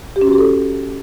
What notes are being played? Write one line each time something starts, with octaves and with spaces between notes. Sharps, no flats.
G4
C#4
F#4
G4
A4